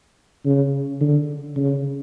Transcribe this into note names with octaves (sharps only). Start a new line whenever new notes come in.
C#3
D3
C#3